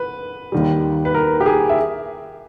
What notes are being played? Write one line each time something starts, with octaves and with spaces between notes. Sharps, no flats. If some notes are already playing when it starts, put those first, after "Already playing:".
Already playing: B4
D#2 D#3 G3
B4
A#4
G4
G#4
E5